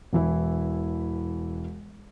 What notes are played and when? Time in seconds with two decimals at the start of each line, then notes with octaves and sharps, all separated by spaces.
0.13 E1 E3 E4